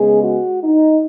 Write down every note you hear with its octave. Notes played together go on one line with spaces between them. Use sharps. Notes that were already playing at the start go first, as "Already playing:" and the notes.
Already playing: C#3 G#3 B3 G#4
F#4
D#4